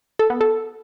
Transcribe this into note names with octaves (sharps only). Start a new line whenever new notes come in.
A4
B3
A4